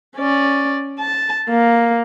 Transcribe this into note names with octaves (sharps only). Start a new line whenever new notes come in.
C#4 D5
A5
A#3